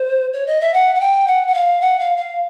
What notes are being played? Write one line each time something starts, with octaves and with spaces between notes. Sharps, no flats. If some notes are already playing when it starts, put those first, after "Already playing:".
Already playing: C5
C#5
D#5
E5
F#5
F#5
G5
F#5
F#5
F5
F#5
F5
F5